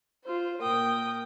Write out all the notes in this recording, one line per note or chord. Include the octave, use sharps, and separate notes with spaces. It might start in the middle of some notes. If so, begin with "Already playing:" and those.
F4 C5
A#2 A#4 G5 D#6